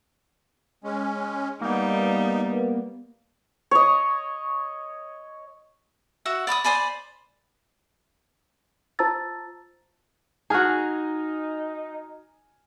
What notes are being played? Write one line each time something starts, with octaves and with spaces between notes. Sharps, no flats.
G#3 C#4
G3 A#3 B3 D#4
C#5 D#5
F#4 E5 F#5
D5 B5 D6 D#6
C5 D5 G#5 B5
F4 C5 A5 A#5 E6 A6
D#4 F#4 G#4 G#5 F6